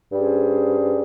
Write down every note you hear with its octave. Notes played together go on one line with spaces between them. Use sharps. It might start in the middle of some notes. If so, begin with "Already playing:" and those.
G2 G3 C#4 G#4 C5